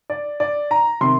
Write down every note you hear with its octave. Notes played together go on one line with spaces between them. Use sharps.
D5
D5
A#5
C3 D#3 C6